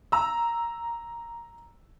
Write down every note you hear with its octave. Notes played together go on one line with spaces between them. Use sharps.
A#5 E6